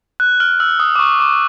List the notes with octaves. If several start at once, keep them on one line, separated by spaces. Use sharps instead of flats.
F#6
F6
E6
D#6
D6
C#6
D6